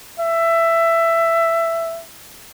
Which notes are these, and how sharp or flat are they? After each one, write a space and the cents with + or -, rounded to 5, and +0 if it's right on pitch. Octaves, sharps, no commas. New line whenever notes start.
E5 +15